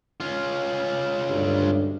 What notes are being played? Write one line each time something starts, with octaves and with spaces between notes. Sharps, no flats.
C#4 F4
G#1 D2 G2